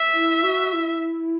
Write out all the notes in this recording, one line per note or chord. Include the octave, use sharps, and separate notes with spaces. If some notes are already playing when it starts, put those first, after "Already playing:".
Already playing: E5
E4
F#4
E4